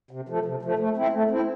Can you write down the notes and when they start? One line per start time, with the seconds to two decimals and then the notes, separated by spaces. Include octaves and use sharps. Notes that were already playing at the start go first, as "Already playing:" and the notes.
0.11 C3
0.29 F3 A3
0.45 C3
0.62 F3 A3
0.79 A3
0.97 C4 E4
1.13 A3
1.30 C4 E4